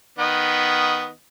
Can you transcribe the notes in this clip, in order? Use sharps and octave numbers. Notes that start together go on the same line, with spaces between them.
D#3 B3 D#5